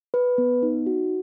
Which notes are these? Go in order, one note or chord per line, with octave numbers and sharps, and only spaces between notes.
B4
B3
D#4
F#4